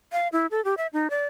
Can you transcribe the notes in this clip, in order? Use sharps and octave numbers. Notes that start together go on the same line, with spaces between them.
F5
E4
A4
G4
E5
D#4
D5